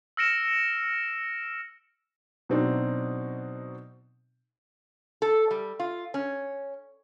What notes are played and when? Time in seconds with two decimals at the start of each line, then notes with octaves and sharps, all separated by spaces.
0.17 E6 F6 A#6 C#7 D7 E7
2.49 B2 F#3 C4 D4 D#4
5.22 A4
5.51 G3
5.80 F4
6.14 C#4